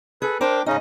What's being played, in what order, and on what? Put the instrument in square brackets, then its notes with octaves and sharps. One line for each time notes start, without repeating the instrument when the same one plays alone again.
[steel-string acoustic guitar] G#4 [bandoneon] A4 B4
[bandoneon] D4 G5 D6 [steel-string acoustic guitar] A#4 C5
[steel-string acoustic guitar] G#2 D#5 [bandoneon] C#3 C#4 D#4